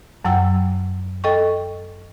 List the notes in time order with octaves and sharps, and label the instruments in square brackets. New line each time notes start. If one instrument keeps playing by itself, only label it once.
[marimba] F#2 F#3 F#5 G5 E6
A4 D#5 G5 C#6